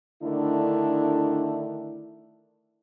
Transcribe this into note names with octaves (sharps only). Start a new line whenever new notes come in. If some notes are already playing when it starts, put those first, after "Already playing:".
D3 D#3 A3 D4 E4